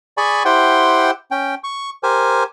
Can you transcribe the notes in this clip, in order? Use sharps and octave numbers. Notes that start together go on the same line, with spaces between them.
G#4 D5 G#5 B5 C#6
E4 G4 C5 F#5 G5 C6
C#4 G5
C#6
G4 A#4 C5 G#5